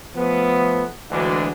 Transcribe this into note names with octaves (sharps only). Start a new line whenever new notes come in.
F3 A3 B3
D2 E3 G#3 D4 F#4